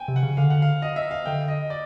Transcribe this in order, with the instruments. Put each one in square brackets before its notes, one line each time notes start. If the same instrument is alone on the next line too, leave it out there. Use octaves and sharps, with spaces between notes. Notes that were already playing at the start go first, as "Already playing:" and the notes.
Already playing: [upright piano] G5 G#5
[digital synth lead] C3
[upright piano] F#5
[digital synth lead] C#3
[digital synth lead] D3 [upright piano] F5
[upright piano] F#5
F5
D#5
E5
F5
[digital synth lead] D3 [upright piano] G5
[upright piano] D#5
D5